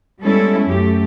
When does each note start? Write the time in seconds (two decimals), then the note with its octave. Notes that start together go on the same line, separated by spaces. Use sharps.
0.21 G3 G#3 B3 C#4 E4 A4
0.68 F#2 A3 G4